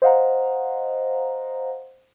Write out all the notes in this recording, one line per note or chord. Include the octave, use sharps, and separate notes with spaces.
C5 D#5 F5 F#5 A#5